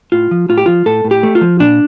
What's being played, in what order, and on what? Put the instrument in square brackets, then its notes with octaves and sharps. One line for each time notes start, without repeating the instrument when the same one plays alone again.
[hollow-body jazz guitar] A2 F4
F3
A2 F4
G4
F3 F4
A2 A4
A2
G4
A3
F4
F3
A#2 D4